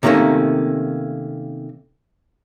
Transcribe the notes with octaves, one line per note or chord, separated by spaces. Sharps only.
C3 D#3 G3 A3 A#3 C#4